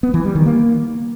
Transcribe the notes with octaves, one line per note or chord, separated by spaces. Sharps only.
B3
E3
G3
D#3
A#3